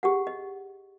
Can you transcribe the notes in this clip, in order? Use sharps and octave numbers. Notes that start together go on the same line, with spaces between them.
G4 G#4 F#5
D#5